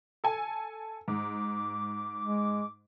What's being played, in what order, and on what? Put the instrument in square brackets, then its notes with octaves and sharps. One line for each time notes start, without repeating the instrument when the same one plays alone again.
[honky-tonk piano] A4 G#5
[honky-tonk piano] G#2 [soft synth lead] D6
[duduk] G#3